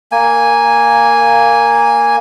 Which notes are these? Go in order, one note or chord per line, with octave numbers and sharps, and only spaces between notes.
A#3 G#5